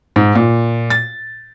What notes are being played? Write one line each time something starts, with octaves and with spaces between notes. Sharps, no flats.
G#2
A#2
A6